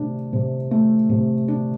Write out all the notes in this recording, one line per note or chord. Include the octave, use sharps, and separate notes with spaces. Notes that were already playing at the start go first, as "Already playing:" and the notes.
Already playing: C3 A3 D4
C3
A3
C3
D4